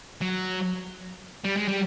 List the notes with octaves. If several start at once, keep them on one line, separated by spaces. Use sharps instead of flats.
F#3
G3
G#3
G3